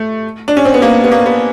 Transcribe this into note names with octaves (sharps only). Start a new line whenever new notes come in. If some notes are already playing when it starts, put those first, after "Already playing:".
Already playing: A3
D4
C#4
C4
B3
A#3
B3
A#3
B3